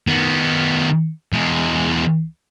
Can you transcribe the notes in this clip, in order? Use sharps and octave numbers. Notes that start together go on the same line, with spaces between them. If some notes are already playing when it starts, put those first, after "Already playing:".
D#3 B3
E2 G#3